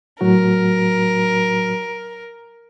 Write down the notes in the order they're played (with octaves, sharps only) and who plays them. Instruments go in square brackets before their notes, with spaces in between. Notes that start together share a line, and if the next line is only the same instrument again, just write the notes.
[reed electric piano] A2 F#3 F#4 [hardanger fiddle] A#4